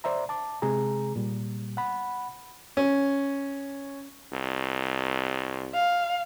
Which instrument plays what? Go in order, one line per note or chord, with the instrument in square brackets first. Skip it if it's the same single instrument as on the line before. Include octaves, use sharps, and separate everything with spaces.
[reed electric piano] C5 D5 E5 A#5
A5 D6
C3 G#3 G#4 A#5
A#2 G3
F#5 B5
[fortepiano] C#4
[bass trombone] C2
[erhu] F5